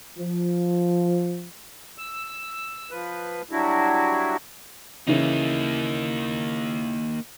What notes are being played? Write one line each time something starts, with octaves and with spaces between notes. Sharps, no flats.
F3
E6
F3 B4
F#3 G3 D4 E4 F#4
C#3 E3 A#3 D#4 E4